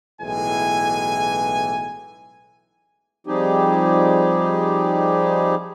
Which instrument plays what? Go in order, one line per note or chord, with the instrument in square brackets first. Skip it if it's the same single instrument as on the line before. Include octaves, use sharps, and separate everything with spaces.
[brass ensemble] B1 A2 E3 G#3 G#5
[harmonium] F3 G3 C4 D#4 G4 G#4